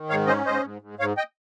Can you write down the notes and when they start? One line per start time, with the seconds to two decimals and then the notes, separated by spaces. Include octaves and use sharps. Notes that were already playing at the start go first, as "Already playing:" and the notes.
Already playing: D#3
0.09 G#2 C#5 F5
0.27 C#4 C5 D#5
0.45 G#2 C5 D#5
0.63 G#2
0.82 G#2
0.99 G#2 C#5 F5
1.17 D#5 G5